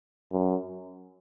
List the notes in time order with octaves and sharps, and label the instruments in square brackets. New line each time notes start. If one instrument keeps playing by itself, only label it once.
[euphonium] F#2